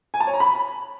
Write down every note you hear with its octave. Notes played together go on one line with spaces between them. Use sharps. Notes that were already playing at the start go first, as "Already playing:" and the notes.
G#5
A5
C#5
A#5
B5